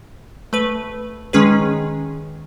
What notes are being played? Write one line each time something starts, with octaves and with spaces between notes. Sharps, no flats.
A3 B4
D#3 G#3 C#4 G#4 B4